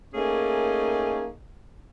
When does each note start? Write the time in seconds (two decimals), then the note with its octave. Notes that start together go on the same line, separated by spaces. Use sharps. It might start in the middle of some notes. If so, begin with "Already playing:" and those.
0.14 A3 A#3 C#4 D#4 G#4